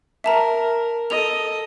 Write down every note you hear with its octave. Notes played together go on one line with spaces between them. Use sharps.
A#4 E5 A5 A#5
A4 D#5 F7